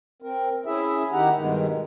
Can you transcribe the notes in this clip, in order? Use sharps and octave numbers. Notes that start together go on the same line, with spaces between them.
C4 A#4
C#4 E4 G#4 E5
D#3 D#4 E4 G4 F#5 A#5
G2 B2 D#3 G#3